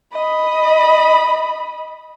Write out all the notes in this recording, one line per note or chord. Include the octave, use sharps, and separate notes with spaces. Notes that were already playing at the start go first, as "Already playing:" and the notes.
D#5 B5